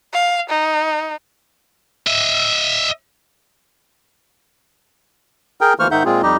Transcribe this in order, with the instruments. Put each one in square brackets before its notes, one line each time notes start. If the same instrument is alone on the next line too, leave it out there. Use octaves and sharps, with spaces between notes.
[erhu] F5
D#4
[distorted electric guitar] D#5 E5
[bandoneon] G#4 A#4 G5
D2 E3 A#3 C5 C#6 F6
G#2 D#3 D#4 E5 F#5 G6
A#2 G#3 C4 F4 G#4
F2 G3 D#4 G4 D#5